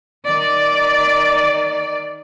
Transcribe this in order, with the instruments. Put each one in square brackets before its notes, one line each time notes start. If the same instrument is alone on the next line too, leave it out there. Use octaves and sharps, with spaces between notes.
[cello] D#3 D5